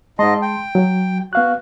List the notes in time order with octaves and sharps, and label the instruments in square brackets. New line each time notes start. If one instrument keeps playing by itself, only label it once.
[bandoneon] G#2 D#5 [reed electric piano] G#3 A5 C6
[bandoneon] G5
[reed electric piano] F#3
[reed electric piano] B3 F5 F#6 [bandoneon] F#4